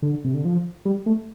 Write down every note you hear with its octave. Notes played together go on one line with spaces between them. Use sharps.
D3
C3
D3
F3
G3
A3